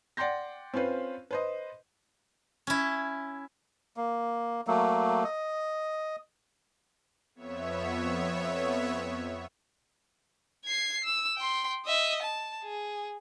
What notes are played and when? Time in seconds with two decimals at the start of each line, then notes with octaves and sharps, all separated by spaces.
0.17 D5 F#5 G5 C6 G6 A#6
0.74 C4 C#4 F4 B4 C5
1.31 B4 C5 D#5
2.67 C#4 E4
3.97 A#3
4.67 F#3 A3 A#3
5.24 D#5
7.35 F2 B3 C#5 E5
10.65 G#6 C7
11.04 E6
11.37 G5 C6
11.86 D#5 E5
12.22 A5
12.63 G#4